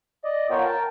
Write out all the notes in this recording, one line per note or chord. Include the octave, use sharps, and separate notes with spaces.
D5 D#5
B3 F4 A#4 C#5 G5
A#4 G5 A5